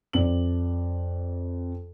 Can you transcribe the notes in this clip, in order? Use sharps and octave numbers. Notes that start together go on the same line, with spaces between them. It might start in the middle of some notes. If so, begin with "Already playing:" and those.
F2 D5 F#7